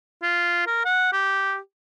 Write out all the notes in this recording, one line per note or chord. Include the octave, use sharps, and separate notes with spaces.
F4
A#4
F#5
G4